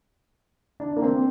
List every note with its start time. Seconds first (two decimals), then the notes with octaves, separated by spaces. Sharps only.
0.80 D4
0.97 A#3
1.02 C4